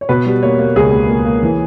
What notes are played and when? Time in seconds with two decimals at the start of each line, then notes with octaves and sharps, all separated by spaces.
0.01 C#5
0.09 B2 B4
0.26 G3
0.43 A#3 C#5
0.59 A#3
0.76 C#2 G#4
0.93 A#3
1.09 A#3
1.25 A#3
1.43 E3